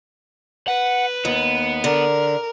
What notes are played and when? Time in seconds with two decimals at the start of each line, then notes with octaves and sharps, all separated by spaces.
0.68 B4 F#5
1.25 D#2 B3
1.84 D3 A#4